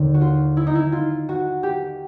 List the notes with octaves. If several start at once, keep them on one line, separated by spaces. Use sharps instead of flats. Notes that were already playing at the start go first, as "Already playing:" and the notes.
Already playing: D#2 D3
F#4
F4
E4
D#4
E4
F4
F#4
G4